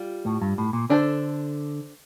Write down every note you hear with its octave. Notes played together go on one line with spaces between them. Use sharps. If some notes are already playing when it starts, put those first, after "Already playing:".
Already playing: G3 F4
A2
G2
A2
A#2
D3 D4 A4 C5